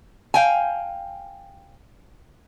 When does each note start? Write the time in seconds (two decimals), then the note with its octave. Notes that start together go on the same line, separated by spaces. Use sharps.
0.34 F5 G5 G#5